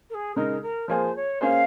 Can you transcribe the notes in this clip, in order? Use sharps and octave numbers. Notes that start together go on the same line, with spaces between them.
A#4
G#4
C#3 G#3 D#4 A#4
A#4
F3 A#3 F4 G#4 C5 C#5
C#5
A#3 C#4 G#4 C5 F5